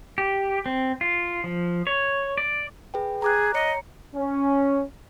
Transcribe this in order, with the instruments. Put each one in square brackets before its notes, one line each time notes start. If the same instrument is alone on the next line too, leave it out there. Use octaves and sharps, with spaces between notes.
[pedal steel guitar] G4
C4
F4
F3
C#5
D5
[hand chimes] G#4 B4 G5
[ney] G#4 [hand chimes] A#5 D6 F#6
[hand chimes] C#5 A#5 C#7 [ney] D#5
[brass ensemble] C#4